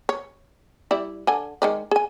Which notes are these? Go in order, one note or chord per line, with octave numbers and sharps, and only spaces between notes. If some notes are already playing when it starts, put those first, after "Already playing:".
C#5
G3 E4 D5
D3 G#5
D#3 G#3 D5
G#4 G#5